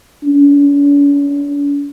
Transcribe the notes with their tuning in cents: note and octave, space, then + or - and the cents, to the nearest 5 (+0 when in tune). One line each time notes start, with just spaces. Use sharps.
C#4 +45